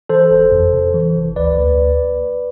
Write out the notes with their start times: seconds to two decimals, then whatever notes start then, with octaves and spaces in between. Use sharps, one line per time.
0.09 E3 A4 C5
0.30 G1
0.52 F2
0.73 C3
0.94 E3
1.16 G1
1.36 D2 B4 D5
1.58 D2